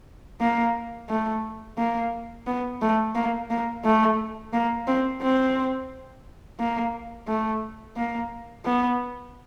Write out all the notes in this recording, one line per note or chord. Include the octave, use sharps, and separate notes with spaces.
A#3
A3
A#3
B3
A3
A#3
A#3
A3
A#3
C4
C4
A#3
A3
A#3
B3